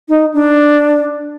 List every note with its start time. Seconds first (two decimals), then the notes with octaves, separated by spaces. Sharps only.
0.09 D#4
0.34 D4